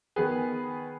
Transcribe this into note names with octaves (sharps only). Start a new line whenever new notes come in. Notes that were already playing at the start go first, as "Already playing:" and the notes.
D#3 B3 G#4 B4